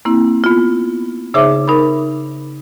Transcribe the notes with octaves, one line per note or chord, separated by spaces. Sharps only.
A#3 C4 E4
B3 F4
C#3 D#4 G#4 C5 E5 D6
D#4 A#4 B5